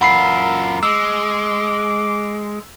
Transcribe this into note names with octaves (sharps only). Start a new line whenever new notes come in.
F#2 F4 E5 F#5 B5 C7
G#3 D6 E6